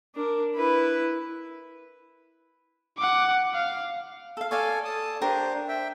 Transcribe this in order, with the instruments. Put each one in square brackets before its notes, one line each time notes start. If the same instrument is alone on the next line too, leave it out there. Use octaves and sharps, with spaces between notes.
[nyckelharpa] D4 A#4
E4 B4
[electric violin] F#5 D6
F5
[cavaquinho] A4 F5
[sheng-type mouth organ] A4 G#5 [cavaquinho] C#5 D5 F5
[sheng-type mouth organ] A5 D#6
[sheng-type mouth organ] D4 C5 [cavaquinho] G4 A#4
[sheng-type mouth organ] E5 G5